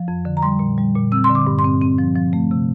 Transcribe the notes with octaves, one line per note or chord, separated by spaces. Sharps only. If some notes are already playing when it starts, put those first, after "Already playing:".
Already playing: F3
F2
D3
A#5
G3 C6
A#2
G3
A#2
C4 E6
C6
D3
D6
G2
C6
C4
C4
F3
F3
A3
C3